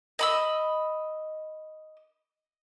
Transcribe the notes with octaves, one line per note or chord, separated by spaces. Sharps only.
D#5 B5 E6